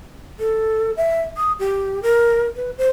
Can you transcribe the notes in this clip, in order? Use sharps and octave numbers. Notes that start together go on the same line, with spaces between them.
A4
E5
D#6
G4
A#4
B4
C5